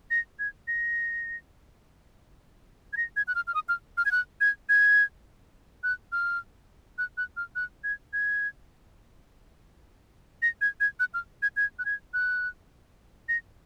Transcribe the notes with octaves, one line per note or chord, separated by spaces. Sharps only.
A#6
G#6
A#6
G#6
A#6
G#6
F#6
F6
F6
D#6
F6
F6
G#6
F#6
G#6
G#6
F#6
F6
F#6
F#6
F6
F#6
G#6
G#6
A#6
G#6
G#6
F#6
F6
G#6
G#6
F#6
G#6
F#6
A#6